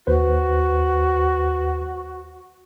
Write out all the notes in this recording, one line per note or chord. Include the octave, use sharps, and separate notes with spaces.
D#2 F#4 B4 C5